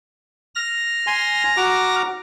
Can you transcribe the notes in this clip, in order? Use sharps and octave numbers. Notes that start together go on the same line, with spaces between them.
F6 A#6
G#5 C6
F#4 A#5 D6